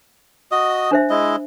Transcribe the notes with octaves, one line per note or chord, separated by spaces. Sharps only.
F#4 D#5 D#6
D4 C5 E5
G#3 E4 D#5